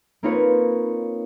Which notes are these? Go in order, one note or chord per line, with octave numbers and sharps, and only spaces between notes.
A#3 C4 D#4 F4 B4 C#5